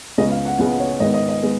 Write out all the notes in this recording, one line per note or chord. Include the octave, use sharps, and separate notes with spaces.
C#2 C#3 G#3 B3 D#5
F5
F#5
C#2 C#3 G#3 B3 F#5
C#5
G#2 D#3 G#3 B3 D#5
D#5
D#5
G#3 B3